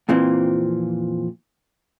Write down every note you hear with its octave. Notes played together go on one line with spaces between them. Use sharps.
F2 A#2 E3 F3 C4